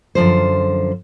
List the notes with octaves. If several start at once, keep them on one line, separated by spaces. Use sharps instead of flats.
F#2 D3 F3 C5